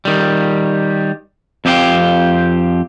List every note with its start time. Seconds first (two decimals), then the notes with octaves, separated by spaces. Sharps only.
0.05 D#3 G3
1.65 F2 C4 G4 G#4 F5 G5